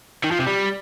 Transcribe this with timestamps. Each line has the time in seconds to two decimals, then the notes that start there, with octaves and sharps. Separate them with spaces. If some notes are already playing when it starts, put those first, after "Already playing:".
0.24 D#3
0.31 F3
0.39 C3
0.46 G3